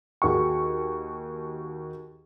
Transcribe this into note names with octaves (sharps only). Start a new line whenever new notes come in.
D#2 F#4 G#4 C#6